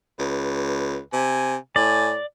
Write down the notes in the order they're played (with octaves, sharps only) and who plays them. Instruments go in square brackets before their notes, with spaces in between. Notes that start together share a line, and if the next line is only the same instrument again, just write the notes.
[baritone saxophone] C#2 [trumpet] B4
[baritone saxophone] C3 [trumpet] G#5
[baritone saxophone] A2 [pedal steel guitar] D5 [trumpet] G#5